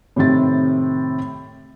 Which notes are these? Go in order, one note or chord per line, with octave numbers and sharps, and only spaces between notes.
A2 C3 D#3 C4 A6